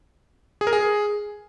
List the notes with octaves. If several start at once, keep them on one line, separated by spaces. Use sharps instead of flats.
G#4
A#4
G#4